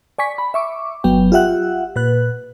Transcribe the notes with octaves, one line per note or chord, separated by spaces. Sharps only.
D5 G#5 C#6 B6
B5
E5 C#6 D6
G1 F#3 B3 G5
F4 G4 E5 F#5 F#6
A#2 B4 F#6